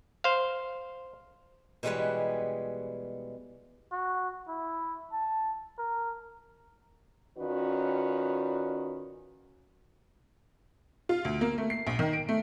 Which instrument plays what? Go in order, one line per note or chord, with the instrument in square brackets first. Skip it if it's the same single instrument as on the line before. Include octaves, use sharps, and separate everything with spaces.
[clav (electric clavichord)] C5 F5
[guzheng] B2 E3 G3 G#3 B4 C#5
[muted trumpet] F#4
E4
A5
A#4
[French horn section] D#3 C#4 F4 F#4 B4 D5
[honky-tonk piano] F4
D2
A#3
A3
C7
A#1
D#3
D7
A3